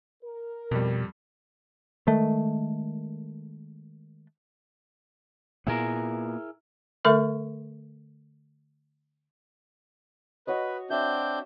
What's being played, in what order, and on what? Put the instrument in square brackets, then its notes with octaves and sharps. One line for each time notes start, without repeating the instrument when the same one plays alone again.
[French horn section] A#4
[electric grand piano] F2 G3 [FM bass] B2
[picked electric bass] D#3 G#3 A3
[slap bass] A#2 B3 [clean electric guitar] E4 G#4 A#4
[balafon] D3 A3 A4 A#4 E5 C#6
[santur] F#4 C#5 D#5 [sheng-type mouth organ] B4
[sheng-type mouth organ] C4 D4 G6 [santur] E5